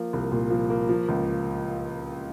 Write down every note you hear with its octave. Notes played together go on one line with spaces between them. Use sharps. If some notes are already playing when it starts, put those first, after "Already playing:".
Already playing: F3 A#3
C2
A#2
F3
A#3
F3
C#2